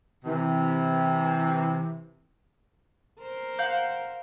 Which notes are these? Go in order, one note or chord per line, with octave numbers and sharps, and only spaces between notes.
C3 E3
A#4 C5
F5 F#5 G6